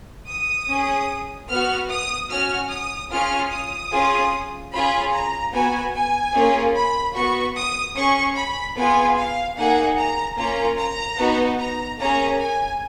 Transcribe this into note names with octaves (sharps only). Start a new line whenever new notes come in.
D#6
C#4 G#4
B3 F#4 F6
D#6
C#4 F#4 F6
D#6
C#4 F4 G#4 F6
D#6
C#4 F4 G#4
C#4 F4 G#4 B5
A#5
B3 F#4 G#5
G#5
A#3 C#4 F4 G#4
B5
B3 F#4 C#6
D#6
C#4 G#4 C#6
B5
B3 F4 G#4 G#5
F5
A#3 D#4 G#4 F#5
A#5
A#3 C#4 F4 A#5
A#5
B3 D#4 F#4
A#5
A#3 C#4 G#4 A#5
G#5